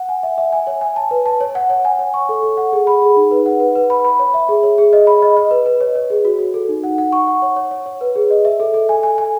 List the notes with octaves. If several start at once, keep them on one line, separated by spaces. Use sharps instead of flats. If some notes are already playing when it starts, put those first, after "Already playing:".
Already playing: F#5
G#5
E5
E5
G#5
C#5
G#5
A5
B4
A5
C#5
F#5
C#5
G#5
C#5
C#6
A4
A4
F#5
G#4
B5
G#4
D#4
B4
F#5
B4
B4
B5
B5
C#5
E5
G#4
C#5
G#4
D#5
B5
D#5
D#5
B4
B4
C#5
C#5
G#4
F#4
F#4
A4
D#4
F#5
F#5
C#6
F#5
C#5
C#5
C#5
C#5
B4
G#4
D#5
E5
A4
A4
G#5
G#5
G#5